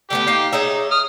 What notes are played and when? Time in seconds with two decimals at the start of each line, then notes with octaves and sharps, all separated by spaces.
0.10 D3 A3 B3 G4 D6
0.27 D#4 F5 G5
0.53 D#4 G#4 C#5 E5
0.91 D#6 F6